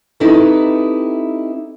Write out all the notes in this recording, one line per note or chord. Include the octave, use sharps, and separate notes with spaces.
C4 D#4 E4 G4 A4 B4